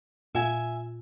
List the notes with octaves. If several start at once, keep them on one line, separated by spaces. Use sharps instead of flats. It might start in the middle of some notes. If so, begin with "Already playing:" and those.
A#2 F4 E5 G#5